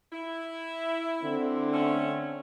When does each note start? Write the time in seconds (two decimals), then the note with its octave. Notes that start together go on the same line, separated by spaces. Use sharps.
0.13 E4
1.22 D3 C4
1.73 A3 C#4